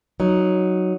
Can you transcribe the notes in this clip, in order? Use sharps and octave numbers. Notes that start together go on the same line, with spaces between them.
F#3 D#4